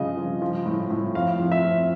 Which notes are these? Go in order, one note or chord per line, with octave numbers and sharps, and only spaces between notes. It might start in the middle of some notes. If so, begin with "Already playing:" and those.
Already playing: G2 C#3 F3 D#5
F3
F3
A2
A2
F2 F5
F3
E5
F2